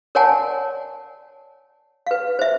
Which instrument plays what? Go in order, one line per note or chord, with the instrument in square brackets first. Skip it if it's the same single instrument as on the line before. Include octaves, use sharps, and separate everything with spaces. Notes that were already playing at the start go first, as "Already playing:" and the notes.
[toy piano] A#4 C#5 D5 F#5 G#5 A5
B4 F5
C5 E5